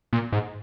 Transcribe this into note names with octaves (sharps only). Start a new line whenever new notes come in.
A#2
G#2